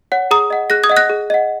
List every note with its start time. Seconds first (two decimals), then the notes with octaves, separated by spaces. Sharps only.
0.12 C#5 F#5
0.31 G#4 A#5 D#6
0.50 D#5 F#5
0.70 G#4 F#6 A#6
0.83 D#6 G#6
0.90 D#5 F#5
0.97 F#6 A#6
1.10 G#4
1.30 D#5 F#5